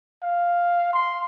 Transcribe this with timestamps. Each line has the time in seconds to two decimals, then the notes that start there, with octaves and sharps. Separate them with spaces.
0.23 F5
0.93 C6